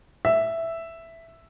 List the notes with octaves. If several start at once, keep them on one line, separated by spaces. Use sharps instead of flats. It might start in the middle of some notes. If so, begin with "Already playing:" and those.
E5